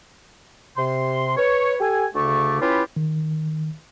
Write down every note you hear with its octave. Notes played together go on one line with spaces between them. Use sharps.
C3 C6
B4 C#5
G4 A4 G#5
D2 C#3 A3 D5 C#6
C#4 E4 F4 G4 B4
D#3